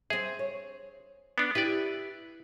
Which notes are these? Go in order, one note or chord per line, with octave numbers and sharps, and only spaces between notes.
C4 G#4 E5
C#5
B3 D4
E4 G4 B4 D5